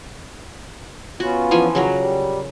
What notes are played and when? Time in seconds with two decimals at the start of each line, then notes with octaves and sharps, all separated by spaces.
1.20 B3 C#4 F4 F#4
1.51 E3 F3 G#5
1.75 C#3 F#3 A#4
1.97 G3